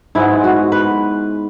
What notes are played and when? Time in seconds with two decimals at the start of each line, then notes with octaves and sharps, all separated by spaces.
0.15 G#2 G#3 B3 E4
0.44 F#4
0.72 B4